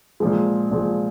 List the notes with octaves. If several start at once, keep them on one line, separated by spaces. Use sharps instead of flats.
A#2 F3 G#3
A#2 F3 G#3